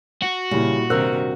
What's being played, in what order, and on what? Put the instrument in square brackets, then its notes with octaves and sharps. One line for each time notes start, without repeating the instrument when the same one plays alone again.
[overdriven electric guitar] F#4
[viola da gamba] A#2 [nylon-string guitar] C#3 [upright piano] G3 E4
[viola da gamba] G2 C3 D#3 [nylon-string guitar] A#4 C5 [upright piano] E6 F#6